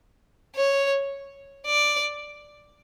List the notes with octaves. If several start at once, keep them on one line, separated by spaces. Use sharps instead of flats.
C#5
D5